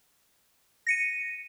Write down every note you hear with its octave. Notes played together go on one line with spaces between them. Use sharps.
A#6 C#7 D#7